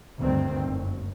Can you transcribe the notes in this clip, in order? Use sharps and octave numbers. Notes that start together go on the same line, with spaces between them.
D2 G2 D#3 C4
F#1